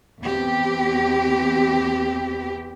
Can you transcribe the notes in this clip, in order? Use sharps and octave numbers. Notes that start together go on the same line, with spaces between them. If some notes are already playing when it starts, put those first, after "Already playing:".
E2 C4 G4